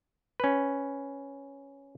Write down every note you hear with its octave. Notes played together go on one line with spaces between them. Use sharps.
C#4 B4